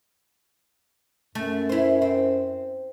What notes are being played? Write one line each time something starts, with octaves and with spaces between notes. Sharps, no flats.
F#2 A3
E4 C5
C4